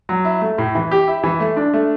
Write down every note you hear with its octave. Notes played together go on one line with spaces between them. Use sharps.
F#3
E4
A3
A2
E3
G4
E4
E3
A3
D4
A3